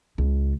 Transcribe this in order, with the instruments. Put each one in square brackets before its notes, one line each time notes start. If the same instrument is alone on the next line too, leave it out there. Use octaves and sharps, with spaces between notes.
[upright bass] C#2